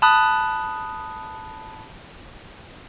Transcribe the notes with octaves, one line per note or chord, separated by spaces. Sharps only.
A5 B5 D#6 F#6